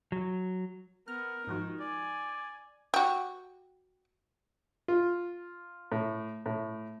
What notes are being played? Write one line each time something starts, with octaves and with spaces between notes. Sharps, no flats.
F#3
B3 A#4 F6
G#2 D#3 F3 D#4 F#4
D5 G#5
F#4 G4
F4
A2
A2